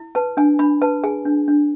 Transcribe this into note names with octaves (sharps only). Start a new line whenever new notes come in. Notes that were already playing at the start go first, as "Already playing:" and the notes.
Already playing: E4
B4 A5
D4 G#5
D4 B5
B4 A5
G#4 G#5
D4
D4